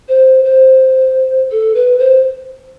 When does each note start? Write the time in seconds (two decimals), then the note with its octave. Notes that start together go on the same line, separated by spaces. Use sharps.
0.08 C5
0.44 C5
1.51 A4
1.75 B4
1.99 C5